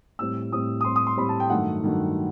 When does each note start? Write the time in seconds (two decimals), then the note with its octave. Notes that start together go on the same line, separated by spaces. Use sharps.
0.19 A2 G3 C4 E6
0.52 A2 G3 C4 D#6
0.81 D#6
0.85 A2 G3 C4 C6
0.96 D#6
1.07 C6
1.17 A2 G3 C4 B5
1.29 A5
1.40 G5
1.50 G2 D#3 F#3 A3 F#5
1.83 G2 D#3 F#3 A3